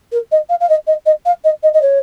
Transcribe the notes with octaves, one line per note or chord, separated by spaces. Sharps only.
A#4
D#5
F5
F5
D#5
D#5
D#5
F5
D#5
D#5
D#5
C#5